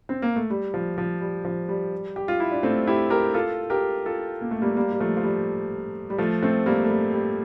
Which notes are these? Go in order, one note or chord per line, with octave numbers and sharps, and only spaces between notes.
C4
A#3
A3
G3
F3
F3
G3
F3
G3
G4
F4
E4
D4
A3 C4
E4 G4
G4 A#4
F4 A4
G4 A#4
F4 A4
A#3
A3
G3 A#3
G3 A#3
G3
F3 A3
F3
G3
G3
F3 A3
A3 C4
G3 A#3
A3
G3
G3